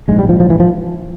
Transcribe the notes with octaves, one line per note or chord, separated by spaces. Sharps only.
A#1 G#2 G#3
G3
F3
F3
E3
F3